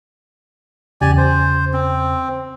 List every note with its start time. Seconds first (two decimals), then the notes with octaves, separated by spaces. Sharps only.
1.01 E2 C#3 G4 D5 G#5
1.18 C5
1.73 C4